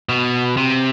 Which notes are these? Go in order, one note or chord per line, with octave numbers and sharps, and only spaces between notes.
B2
C3